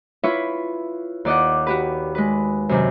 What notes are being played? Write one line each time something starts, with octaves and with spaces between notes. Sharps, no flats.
E4 F4 B4 C#5 E5
D#2 D5 D#5 F#5
F#4 G4 B4
G#3 B4
F#2 C3 D#3